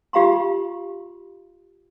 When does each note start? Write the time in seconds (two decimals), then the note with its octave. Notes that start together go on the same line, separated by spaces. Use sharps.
0.13 F4 G4 F5 A#5 C6